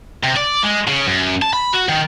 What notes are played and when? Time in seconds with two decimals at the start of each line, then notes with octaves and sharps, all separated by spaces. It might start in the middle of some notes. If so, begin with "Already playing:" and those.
0.24 C3
0.37 D5
0.64 G#3
0.88 C#3
1.07 F#2
1.42 A5
1.53 B5
1.73 F#4
1.89 D#3